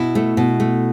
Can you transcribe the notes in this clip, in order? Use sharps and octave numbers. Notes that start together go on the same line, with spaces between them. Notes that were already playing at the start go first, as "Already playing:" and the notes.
Already playing: B2 E4
A3
B2
A3